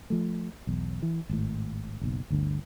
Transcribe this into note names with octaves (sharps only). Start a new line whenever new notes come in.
F3 A3
B1 E2
E3
G#1 A2
F#1 B1
G1 D2 D3